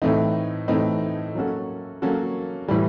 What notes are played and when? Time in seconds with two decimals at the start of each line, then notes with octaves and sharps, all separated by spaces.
0.02 A2 E3 A3 C4 D#4
0.68 A2 E3 A3 C4 D#4
1.35 F#3 A#3 C#4 F#4 A4
2.02 F#3 A#3 C#4 F#4 A4
2.68 A2 E3 G3